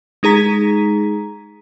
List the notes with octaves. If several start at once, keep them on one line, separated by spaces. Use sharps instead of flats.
G#3 D#4 G#4 A#5 B6